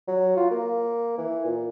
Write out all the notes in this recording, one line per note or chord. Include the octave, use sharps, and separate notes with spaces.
F#3
F4
A#3
E3
A#2